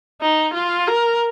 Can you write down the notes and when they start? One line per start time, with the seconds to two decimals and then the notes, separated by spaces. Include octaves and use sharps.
0.21 D#4
0.54 F4
0.88 A#4